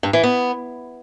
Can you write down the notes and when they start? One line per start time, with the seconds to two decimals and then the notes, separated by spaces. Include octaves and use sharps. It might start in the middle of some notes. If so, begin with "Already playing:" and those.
0.03 G2
0.13 E3
0.23 B3